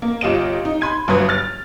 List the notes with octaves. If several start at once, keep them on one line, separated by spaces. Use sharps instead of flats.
A#3
G1 F4 G4 D#5 D7 E7
D#4
B5 C6 G#6 D#7
G1 G2 F#3 B4 D#6 G#6
F6 A6